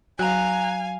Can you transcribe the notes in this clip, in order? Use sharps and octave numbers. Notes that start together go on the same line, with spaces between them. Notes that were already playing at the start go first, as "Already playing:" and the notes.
F#3 F5 G#5 A#5 F#6